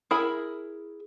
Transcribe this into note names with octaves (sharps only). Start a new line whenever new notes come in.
E4 G#4 A#4 B5